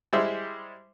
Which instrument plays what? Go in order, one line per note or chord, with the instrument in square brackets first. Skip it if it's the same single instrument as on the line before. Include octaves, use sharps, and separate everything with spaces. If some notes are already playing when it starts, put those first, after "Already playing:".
[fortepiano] G3 G#3 E4 C5 E5